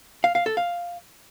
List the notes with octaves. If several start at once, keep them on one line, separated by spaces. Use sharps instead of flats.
F5
F5
A4
F5